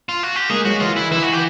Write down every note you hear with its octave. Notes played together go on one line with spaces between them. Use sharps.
F4
F#4
G4
G#3 A#3 G#4
F#3 G#3 F#4
E3 F4
E4
E3 E4
F#4
G4